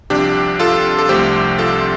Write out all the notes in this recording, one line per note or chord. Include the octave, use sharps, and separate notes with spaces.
C2 C3 F3 D4 G4
F4 A4
A4
C2 C3 F3 A3 D4 G4 C5
F4 A4